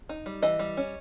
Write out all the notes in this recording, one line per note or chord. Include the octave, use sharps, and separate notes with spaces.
D#4
G3
E3 D#5
G3
C#4